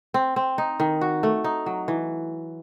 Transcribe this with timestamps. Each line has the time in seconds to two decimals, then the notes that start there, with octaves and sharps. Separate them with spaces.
0.14 C4
0.36 C4
0.58 D#4
0.80 D#3
1.01 F#4
1.23 A3
1.44 D#4
1.66 F#3
1.88 E3